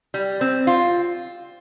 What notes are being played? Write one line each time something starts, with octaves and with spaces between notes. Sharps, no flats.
G3
C4
F4